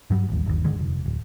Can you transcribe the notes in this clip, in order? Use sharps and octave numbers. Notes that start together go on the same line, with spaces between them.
G2 F#3 G3
A1 D#2
G1 D#2
G#2 D3 D#3 G#3
F1
D1